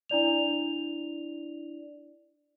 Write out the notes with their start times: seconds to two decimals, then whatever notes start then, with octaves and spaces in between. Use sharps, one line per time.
0.09 D4 E4 D5 F7